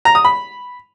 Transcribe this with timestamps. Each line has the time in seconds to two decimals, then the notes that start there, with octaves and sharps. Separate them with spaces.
0.05 A#5
0.15 D#6
0.25 B5